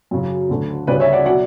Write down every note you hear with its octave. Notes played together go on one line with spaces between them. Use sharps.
F#2 C#3 F#3
D2 D3 A3
D2 C#3 G3 B4 D5
C#5 E5
D5 F#5
B2 F#3 D5 F#5